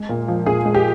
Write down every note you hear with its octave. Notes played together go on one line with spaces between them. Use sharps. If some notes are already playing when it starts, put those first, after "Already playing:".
Already playing: G#3
A#2
F3
A#2 G#4
G#3
G4